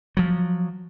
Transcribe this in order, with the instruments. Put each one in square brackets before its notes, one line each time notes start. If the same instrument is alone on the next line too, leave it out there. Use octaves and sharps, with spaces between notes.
[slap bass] F3 F#3